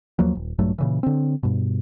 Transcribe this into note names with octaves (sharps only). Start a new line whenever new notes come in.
D#2 F3 F#3 A#3
D#1
A#1 G2 F#3 A3
A#2 C#3 E3
D3 C4
G2 B2